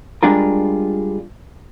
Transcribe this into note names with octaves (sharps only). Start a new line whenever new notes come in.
G3 G#3 D4 F4 A#4